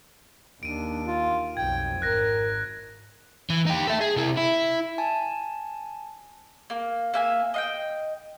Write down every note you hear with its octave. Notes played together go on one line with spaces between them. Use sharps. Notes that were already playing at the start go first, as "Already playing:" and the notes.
D#2 D4 D7 D#7
F4
B1 F2 G5 G#6
G#1 A#4 F#6 A#6
E3
D#4 G4
A4 E5
G#4
C3 E4
E4
G#5 A5
A#3
A#3 E5 G#5
D#5 F5 G5